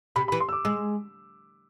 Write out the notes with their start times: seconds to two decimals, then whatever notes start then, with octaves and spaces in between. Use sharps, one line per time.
0.16 C3 B5
0.28 B5
0.32 E3
0.40 C6
0.49 E6
0.53 D6
0.65 G#3 E6